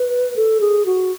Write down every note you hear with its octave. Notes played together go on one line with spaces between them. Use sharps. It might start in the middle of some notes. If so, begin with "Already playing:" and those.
Already playing: B4
A4
G#4
F#4